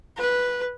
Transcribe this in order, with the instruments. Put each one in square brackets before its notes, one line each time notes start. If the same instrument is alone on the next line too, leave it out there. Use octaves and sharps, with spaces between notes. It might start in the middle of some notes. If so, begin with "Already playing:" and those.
[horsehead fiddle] B4